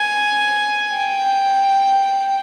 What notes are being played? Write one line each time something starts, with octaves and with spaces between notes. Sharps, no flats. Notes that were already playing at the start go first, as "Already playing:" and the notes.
Already playing: G#5
G5